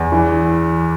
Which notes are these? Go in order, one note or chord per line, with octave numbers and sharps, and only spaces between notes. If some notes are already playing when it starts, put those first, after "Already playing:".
Already playing: E2
E3